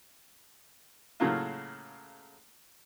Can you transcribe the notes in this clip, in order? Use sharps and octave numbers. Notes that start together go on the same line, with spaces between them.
A2 C#3 F#3 A#3 F4